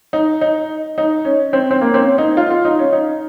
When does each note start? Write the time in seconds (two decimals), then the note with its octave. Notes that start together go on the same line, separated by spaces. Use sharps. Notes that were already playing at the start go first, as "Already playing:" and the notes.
0.13 D#4
0.41 D#4
0.98 D#4
1.25 C#4
1.53 C4
1.71 C4
1.81 A#3
1.94 C4
2.00 C#4
2.18 D#4
2.37 F4
2.50 F4
2.65 D#4
2.79 C#4
2.93 D#4